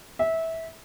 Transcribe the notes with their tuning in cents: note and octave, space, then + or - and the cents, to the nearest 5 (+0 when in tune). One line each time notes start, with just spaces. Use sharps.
E5 -20